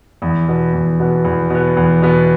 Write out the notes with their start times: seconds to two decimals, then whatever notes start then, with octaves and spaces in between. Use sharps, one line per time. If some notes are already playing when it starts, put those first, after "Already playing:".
0.22 E2
0.48 B2 B3
0.74 E2
1.00 B2 B3
1.24 E2
1.50 B2 B3
1.77 E2
2.02 B2 B3